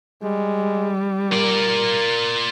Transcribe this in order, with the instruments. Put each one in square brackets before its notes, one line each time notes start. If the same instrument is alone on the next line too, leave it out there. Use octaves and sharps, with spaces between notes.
[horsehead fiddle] G3 [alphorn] G#3
[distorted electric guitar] F4 D5 [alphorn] A#4